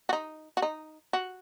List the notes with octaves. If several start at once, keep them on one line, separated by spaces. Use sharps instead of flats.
F#4
D#4
F#4
D#4
F#4